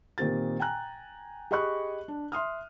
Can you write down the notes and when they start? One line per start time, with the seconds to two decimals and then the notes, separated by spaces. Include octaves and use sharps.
0.18 A#2 D#3 C4 G4 A6
0.60 G5 G#5 A#5 F#6
1.51 G4 G#4 D#5 B5 C#6 F#6
2.08 D4
2.32 E5 C6 D#6 F6